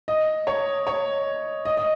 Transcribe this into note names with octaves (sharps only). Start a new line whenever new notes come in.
D#5
C#5
C#5
D#5
D#5